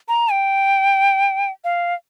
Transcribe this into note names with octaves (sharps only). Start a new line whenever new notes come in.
A#5
G5
F5